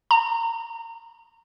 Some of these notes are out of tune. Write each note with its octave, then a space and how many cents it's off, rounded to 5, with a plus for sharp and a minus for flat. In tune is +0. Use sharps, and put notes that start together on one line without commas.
A#5 -25